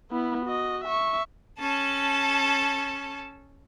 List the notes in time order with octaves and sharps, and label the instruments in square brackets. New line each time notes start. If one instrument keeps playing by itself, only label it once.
[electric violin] B3 E4
F#4 D#5
E5 C#6
[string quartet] C#4 A4 A5